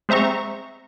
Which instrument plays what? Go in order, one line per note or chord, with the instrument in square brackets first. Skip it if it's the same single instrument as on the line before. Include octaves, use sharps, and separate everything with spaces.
[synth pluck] G#3 C4 E5 A#5 C#6